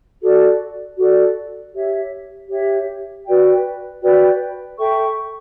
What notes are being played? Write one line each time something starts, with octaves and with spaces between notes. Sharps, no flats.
F#4 A4 D5
F#4 A4 D5
G4 C#5 E5
G4 C#5 E5
F#4 B4 D5 G5
F#4 B4 D5 G5
A4 E5 G5 C#6